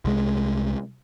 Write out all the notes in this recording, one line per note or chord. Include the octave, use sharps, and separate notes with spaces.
C2 G#3